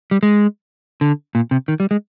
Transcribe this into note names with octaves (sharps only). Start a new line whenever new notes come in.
G3
G#3
D3
A#2
C3
D#3
G3
G#3